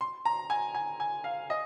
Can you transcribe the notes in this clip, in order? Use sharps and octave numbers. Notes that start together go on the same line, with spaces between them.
C6
A#5
G#5
G#5
G#5
F5
D#5